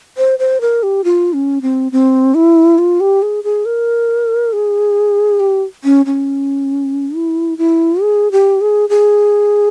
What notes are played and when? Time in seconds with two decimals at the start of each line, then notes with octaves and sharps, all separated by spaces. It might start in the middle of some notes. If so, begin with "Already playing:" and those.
0.17 C5
0.39 C5
0.61 A#4
0.83 G4
1.04 F4
1.33 C#4
1.62 C4
1.92 C4
2.35 E4
2.78 F4
3.00 G4
3.22 G#4
3.44 G#4
3.65 A#4
4.53 G#4
5.40 G4
5.84 C#4
6.06 C#4
7.15 E4
7.58 E4
8.02 G#4
8.32 G4
8.61 G#4
8.89 G#4